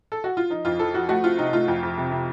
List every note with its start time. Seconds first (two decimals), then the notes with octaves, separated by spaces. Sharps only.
0.12 A4
0.24 F#4
0.37 F4
0.50 F3 D#4
0.65 F2 F4
0.79 F3 A4
0.94 F3 F#4
1.09 A3 F#4
1.24 C4 F4
1.38 C3 D#4
1.53 A3 F4
1.68 F2
1.83 F2
1.98 C3
2.12 C3